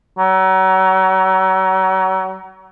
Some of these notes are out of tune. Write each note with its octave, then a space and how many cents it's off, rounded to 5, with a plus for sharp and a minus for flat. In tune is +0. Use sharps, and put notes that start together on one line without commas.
F#3 +35